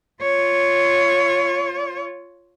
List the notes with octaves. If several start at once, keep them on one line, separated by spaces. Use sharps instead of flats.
F4 C#5